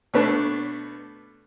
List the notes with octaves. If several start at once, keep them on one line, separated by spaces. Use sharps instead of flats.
B2 A3 B3 D4